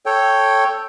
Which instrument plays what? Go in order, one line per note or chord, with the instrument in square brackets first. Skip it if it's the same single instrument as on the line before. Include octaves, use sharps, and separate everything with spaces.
[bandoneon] A4 C#5 G5